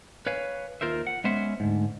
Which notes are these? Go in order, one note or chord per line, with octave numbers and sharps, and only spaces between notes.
B4 C#5 F5 G#5
D#2 F4 A#4 C5 E5
F#5
G#3 B3 C#4 C5 E5 F#5
D2 G#2